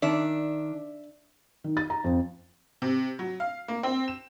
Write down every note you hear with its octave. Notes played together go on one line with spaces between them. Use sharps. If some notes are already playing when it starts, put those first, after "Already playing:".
D#3 D4 E5
D#3
A6
A#5
F2
C3
F#3
F5
A#3
C4
E7